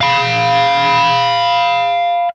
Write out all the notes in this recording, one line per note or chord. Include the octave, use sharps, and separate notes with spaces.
F5 B5